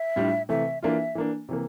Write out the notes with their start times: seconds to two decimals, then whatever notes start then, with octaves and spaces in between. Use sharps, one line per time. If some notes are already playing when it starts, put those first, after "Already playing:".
Already playing: E5
0.16 A2 G3 D4 F4
0.49 C3 E3 A3 E5
0.83 E3 A#3 D4 F4 E5
1.15 E3 A#3 D4
1.49 C3 E3 A#3